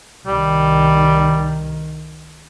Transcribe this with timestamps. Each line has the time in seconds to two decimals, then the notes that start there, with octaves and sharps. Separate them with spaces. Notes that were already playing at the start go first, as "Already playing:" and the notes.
0.27 C2 D#3 G3